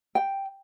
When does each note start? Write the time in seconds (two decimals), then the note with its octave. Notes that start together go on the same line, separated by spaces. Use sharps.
0.15 G5